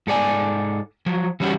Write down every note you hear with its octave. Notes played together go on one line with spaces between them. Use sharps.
G#2 A4 D5 G#5
F3 F#3
E3 G3 C#4 E4 F#4 G4